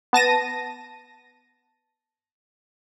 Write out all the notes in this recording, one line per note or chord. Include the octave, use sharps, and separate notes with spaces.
B3 A5 A#6 D#7